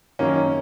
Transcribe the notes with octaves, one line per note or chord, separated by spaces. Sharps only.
F#2 D#3 A#3 C#4